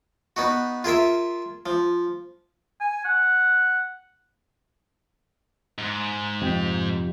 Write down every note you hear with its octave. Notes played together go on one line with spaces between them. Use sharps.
B3 D#4 F#4
F4 G#4 A#4 E5
F3
G#5
F#5
G#2
F2 C3 G4